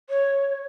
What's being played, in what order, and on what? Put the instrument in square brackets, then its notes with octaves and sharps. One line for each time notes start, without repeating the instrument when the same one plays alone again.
[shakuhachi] C#5